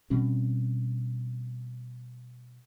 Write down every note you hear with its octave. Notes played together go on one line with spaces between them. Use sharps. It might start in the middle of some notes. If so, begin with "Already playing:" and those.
B2 G3 C4 C#4